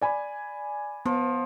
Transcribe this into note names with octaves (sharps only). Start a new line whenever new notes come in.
D5 G#5 B5
F3 B3